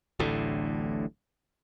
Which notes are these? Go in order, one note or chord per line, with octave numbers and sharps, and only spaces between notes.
D1 A1 D2 A2